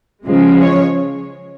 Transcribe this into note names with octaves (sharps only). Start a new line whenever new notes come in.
C#3 F3 G#3
C#5